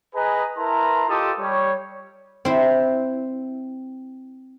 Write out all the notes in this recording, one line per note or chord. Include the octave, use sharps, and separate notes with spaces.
G#4 B4 D#5 G#5 A#5
E4 A#4 B4 A5 A#5 C6
F4 G4 A4 D#5 A5 D#6
G3 C#5
C4 E4